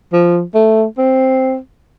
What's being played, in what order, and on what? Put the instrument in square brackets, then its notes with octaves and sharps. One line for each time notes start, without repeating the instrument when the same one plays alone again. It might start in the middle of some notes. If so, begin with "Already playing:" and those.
[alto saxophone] F3
A3
C4